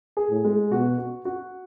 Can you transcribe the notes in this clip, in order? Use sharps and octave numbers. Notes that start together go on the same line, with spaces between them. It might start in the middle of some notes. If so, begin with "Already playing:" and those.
G#4
A2
G#3
B2 F#4
F#4
F#4